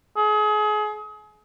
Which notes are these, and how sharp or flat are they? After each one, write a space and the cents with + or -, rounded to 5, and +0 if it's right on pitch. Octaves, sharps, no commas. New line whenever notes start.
G#4 +30